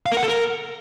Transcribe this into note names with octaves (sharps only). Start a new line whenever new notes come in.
F5
A#4
F#5
A4
A#4